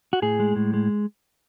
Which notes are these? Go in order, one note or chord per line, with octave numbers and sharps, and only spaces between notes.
F#4
A2 G#4
G#3
A2
G#3